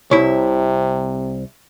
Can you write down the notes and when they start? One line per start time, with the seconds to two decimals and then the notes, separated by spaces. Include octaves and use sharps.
0.11 C2 C3 E4 C#5